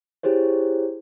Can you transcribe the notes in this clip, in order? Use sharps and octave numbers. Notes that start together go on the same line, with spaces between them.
E4 G4 G#4 C5 C#5